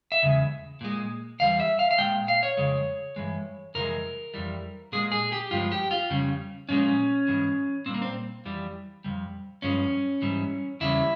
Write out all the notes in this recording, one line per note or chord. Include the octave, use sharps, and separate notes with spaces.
E5
E2 C#3 G#3
A#2 G#3
E2 E3 G3 F5
E5
F5
F5
A#2 G#3 G5
F5
C#5
F2 C#3 G#3
G2 E3 G#3
F2 C3 E3 G#3 A#4
F2 E3 G3
A#2 G#3 G#4
G#4
G4
G2 F3 G#3 F4
G4
F4
F2 C#3 G3
A#2 F3 G#3 C#4
G#2 E3 G#3
A#2 G3 C4
A#3
C4
F2 E3 G3
F2 C3 G3
G2 F3 G#3 C#4
G#2 E3 G3
E2 C#3 G3 E4